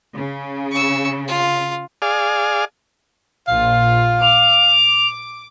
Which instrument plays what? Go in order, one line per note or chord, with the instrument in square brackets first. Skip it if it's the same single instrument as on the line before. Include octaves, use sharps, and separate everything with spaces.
[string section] C#3
[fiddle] C#6 E6
F4
[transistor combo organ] G#4 D5 F5
[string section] A#1 F4 [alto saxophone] F5
[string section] D6 [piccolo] F7